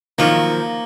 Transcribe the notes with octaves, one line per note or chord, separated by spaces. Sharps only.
D#3 F3 F#3 A#3